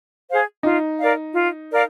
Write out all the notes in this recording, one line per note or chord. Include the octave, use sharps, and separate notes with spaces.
G#4 C5 F5
D#4 F4
A#4 D5 F5
F4
A#4 D5 F5